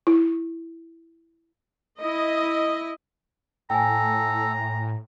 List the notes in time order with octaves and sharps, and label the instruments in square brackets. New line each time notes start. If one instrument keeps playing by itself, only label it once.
[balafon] E4
[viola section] E4 D#5
[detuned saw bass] A2 [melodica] A4 [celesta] G5 G#5 [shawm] A#5